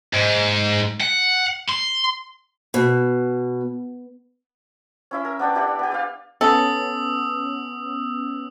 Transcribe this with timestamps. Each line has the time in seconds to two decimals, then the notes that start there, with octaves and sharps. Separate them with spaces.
0.14 G#2
1.01 F#5
1.69 C6
2.74 B2
5.11 C#4 E4 E5
5.25 A#4
5.39 B3 D4 D5 G5
5.55 E4 G4 D5 F#5
5.79 B3 G4
5.92 D5 F5
6.41 B3 C#4 A4 D#6 E6